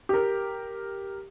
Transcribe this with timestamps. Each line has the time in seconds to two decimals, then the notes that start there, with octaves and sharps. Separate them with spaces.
0.09 G4 A#4